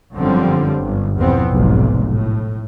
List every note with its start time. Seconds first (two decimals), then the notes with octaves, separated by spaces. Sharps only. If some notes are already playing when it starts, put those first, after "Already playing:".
0.14 G1 F#2 D3 F3 G3 C4
0.76 G1
1.17 E2 B2 F3 B3 C4
1.51 F1 B1 G#2
2.11 A2